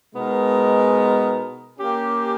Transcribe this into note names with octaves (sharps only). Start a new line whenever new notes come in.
B2 G#3 B3 D#4 A#4
A#3 C#4 G4